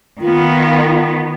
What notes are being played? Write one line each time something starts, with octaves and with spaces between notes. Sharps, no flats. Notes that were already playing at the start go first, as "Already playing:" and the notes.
D#3 B3 F4